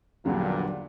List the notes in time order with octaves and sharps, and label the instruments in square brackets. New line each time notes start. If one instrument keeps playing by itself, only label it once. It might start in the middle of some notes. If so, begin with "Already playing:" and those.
[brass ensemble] A#1 G2 A#2 [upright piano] E2 D3 F#3